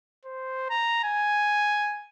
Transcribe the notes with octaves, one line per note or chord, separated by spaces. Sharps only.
C5
A#5
G#5